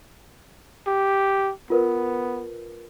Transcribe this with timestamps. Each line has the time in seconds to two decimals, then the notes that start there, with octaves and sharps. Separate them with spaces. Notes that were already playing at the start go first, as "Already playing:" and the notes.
0.87 G4
1.70 B3 F4 A#4 B4